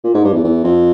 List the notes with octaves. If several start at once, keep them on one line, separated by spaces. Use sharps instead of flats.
A#2
G#2
G2
E2
E2
F2